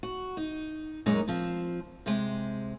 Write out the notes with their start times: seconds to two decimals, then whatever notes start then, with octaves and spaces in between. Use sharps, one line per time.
0.03 F#4
0.37 D#4
1.06 F#2 A#2 G#3 D#4 C#5
1.28 F3 C4
2.06 C3 G#3